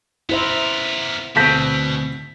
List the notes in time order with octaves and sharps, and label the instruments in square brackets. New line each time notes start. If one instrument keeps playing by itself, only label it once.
[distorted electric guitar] B3 A#4 [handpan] E4 C5 E5
[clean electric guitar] D2 C4 [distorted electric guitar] B2 [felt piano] A5 G6 B6